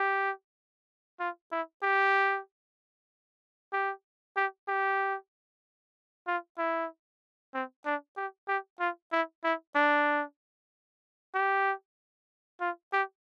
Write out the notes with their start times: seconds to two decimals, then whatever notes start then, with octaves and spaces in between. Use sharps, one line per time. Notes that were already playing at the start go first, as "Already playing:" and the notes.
Already playing: G4
1.20 F4
1.51 E4
1.82 G4
3.72 G4
4.36 G4
4.68 G4
6.27 F4
6.58 E4
7.54 C4
7.85 D4
8.17 G4
8.48 G4
8.80 F4
9.12 E4
9.44 E4
9.75 D4
11.34 G4
12.60 F4
12.93 G4